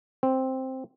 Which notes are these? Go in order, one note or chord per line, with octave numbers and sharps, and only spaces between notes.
C4